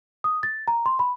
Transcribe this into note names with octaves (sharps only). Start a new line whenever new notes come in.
D#6
A6
A#5
C6
B5